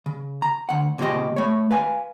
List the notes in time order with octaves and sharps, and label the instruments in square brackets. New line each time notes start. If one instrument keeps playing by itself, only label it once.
[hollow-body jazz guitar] C#3
A#5
D2 F#5
C#2 A#2 C#3 C4 G4 D#5
A3 C#5
B4 F5 G#5